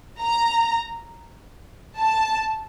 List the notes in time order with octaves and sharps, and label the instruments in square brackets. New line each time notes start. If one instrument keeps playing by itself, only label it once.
[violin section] A#5
A5